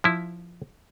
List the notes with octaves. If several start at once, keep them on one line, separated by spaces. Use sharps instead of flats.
F3 E4